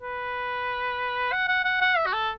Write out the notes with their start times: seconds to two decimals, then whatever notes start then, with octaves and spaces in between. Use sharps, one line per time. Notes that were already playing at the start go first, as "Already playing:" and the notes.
0.02 B4
1.32 F#5
1.48 F#5
1.65 F#5
1.81 F#5
1.97 E5
2.06 F#4
2.13 A4